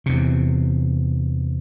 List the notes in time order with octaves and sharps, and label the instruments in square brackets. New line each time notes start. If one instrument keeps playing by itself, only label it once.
[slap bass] E2 C3